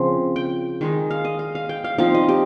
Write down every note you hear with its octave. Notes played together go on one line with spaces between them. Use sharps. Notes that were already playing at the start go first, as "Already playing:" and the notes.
Already playing: C#3 F3 C4
G5
D#3 G#3 D#4
F5
D#5
F5
F5
G5
F5
F3 C4 D#4 F5
D#5
G4